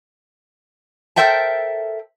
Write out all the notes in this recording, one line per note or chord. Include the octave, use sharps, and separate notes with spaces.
A4 A#4 C5 E5 G5 A5